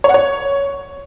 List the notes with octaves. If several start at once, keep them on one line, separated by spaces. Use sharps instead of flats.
C#5
F#5
C#5